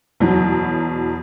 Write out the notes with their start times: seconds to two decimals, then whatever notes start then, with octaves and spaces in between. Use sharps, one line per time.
0.20 E2 B2 F#3